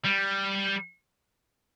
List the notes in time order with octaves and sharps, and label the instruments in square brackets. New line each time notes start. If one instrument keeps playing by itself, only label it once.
[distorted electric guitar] G3